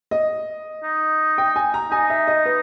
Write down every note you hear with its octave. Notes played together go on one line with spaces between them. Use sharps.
D#5
D#4
G5
G#5
A#5
D#4 G#5
E5
D#5
B4